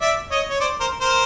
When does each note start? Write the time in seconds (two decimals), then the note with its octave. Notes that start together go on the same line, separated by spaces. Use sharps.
0.01 D5 E5
0.30 C#5 D#5
0.49 C#5
0.60 C5 D5
0.80 A#4 C5
1.00 A#4 C5